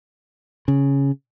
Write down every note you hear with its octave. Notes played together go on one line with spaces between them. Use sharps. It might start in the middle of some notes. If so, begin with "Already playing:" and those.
C#3